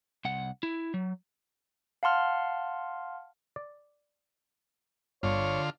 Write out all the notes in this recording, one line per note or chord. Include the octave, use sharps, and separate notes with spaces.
C2 F#5
E4
F#3
F5 F#5 A5 C6 F6
D5
G1 D3 F4 C#5